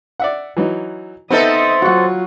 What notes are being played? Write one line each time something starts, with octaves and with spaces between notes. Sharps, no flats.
D5 E5 F#5
E3 F#3 D#4
B3 C4 D#4 A4 B4 D#5 E5
F#3 F4 F#4 F#5